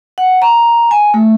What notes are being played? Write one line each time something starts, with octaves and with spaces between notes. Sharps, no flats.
F#5
A#5
G#5
A3